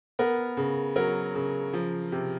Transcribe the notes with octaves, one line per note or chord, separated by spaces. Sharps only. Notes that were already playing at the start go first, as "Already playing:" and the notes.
B3 A#4
C#3
F#3 A#4
C#3
F3
C3